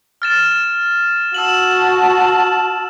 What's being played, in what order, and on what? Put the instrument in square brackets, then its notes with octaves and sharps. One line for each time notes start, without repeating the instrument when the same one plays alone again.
[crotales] F6 A6 E7
[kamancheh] F#4 A5 [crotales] E6 E7 F#7